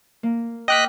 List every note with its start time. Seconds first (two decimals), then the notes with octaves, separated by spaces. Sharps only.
0.23 A#3
0.68 D#5 G5 D6 F6 F#6 B6